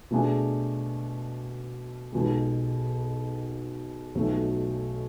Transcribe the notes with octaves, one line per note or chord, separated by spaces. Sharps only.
B2 A3 D4 G#4
B1 B2 G#3
B1 B2 F#3 A3